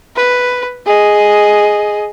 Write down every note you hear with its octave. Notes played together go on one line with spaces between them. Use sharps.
B4
G#4 D#5